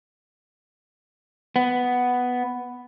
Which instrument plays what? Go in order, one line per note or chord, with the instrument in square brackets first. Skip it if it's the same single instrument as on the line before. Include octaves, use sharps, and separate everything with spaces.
[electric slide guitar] B3